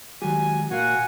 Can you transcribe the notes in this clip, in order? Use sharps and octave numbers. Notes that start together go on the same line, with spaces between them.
D#3 F#3 G#3 G4 G#5
A#2 F#4 F5 F#5 G#5